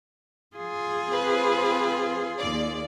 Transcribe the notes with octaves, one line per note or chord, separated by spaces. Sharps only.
F4 G#4
C4 B4
D#2 D5